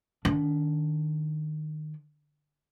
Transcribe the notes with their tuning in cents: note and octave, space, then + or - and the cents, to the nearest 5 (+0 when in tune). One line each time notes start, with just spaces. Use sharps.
D#3 -20 D4 -30